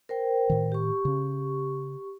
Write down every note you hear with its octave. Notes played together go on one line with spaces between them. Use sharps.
A#4 C5 G5
A2 D#3
G4 C#6
C#3 C#4